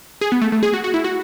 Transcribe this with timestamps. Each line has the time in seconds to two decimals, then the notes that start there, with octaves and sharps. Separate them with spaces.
0.21 G#4
0.32 B3
0.42 A3
0.52 A3
0.63 G#4
0.74 F#4
0.84 F#4
0.94 E4
1.04 F#4